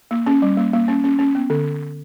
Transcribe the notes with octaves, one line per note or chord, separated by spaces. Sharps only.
A#3
C#4
G3
A#3
A#3
C#4
C#4
C#4
B3
D3